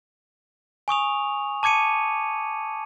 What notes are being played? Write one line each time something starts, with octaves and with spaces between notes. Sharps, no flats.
G#5 C#6 D#6 F7
A5 D6 G#6 C#7 D#7